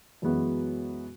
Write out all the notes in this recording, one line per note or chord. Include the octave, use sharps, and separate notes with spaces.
F#2 E3 G#3 B3 F#4